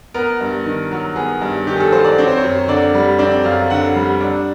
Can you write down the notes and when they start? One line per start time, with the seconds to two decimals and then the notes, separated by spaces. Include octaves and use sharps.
0.14 B3 A#4
0.41 G2
0.66 D#3
0.91 F#3
1.16 B3 G#4
1.42 G2
1.67 D#3 G4
1.76 G#4
1.80 A4
1.92 F#3 C5
2.04 D5
2.18 C4 C#5
2.27 C5
2.37 C#5
2.43 F#2
2.68 D3 D5
2.95 G3
3.19 C4 D5
3.44 F#2 F5
3.70 D3 F#5
3.96 G3
4.20 D4